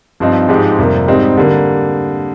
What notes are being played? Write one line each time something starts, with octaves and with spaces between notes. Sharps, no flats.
G2 F3 C4 D#4
G#2 F3 G#3 D#4 G4
F2 C3 G3 A#3
G#2 G3 C4 D#4
D3 G3 A#3